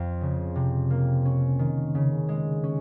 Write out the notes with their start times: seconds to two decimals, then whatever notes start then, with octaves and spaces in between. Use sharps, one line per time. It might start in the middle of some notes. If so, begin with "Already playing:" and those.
Already playing: F2 F3
0.21 C#3
0.56 C3
0.90 A#3
1.25 C#4
1.59 D#3
1.95 C#3
2.29 G#3
2.63 C#4